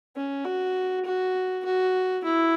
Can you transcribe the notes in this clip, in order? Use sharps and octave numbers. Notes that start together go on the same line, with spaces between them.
C#4
F#4
F#4
F#4
E4